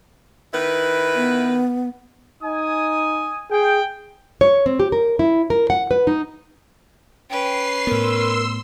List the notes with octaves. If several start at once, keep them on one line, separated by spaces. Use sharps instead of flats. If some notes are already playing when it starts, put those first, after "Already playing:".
D#3 E4 B4
B3
D#4 G#5 D#6
G#4 G5
C#5
C4
G4
A#4
E4
A#4
F#5
B4
D#4
C#4 B4 G5 C7
A2 B3 A#4 C6 E6